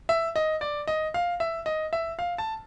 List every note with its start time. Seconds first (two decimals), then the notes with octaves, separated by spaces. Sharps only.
0.09 E5
0.36 D#5
0.61 D5
0.88 D#5
1.14 F5
1.40 E5
1.66 D#5
1.93 E5
2.19 F5
2.38 A5